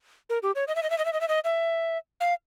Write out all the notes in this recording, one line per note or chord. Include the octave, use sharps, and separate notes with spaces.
A#4
G4
C#5
D#5
E5
D#5
E5
D#5
E5
D#5
E5
D#5
E5
F5